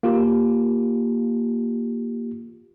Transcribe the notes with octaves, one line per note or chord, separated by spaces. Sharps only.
A#3 F4 G4